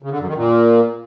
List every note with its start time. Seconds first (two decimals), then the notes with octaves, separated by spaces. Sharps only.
0.03 C#3
0.11 D3
0.19 F#2
0.28 D#3
0.36 A#2